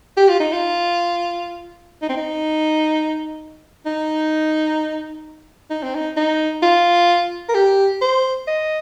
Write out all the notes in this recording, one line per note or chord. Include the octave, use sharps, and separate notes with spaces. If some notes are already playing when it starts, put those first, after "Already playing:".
G4
F4
D#4
F4
D#4
C4
D#4
D#4
D#4
C4
D#4
D#4
F4
A#4
G4
C5
D#5